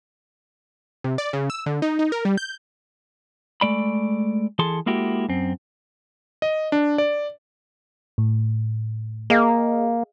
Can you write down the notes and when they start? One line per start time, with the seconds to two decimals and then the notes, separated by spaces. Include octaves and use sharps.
1.04 C3
1.18 D5
1.33 C#3
1.50 E6
1.66 D3
1.82 D#4
1.99 D#4
2.12 A#4
2.25 G3
2.37 G6
3.61 G#3 A3 D5 B5
4.59 E3 G#4 A4 A5 C6
4.86 G#3 A#3 E4 F#4 G4
5.29 F#2 C4
6.42 D#5
6.72 D4
6.98 D5
8.18 A2
9.30 A#3 G#4 D#5 F5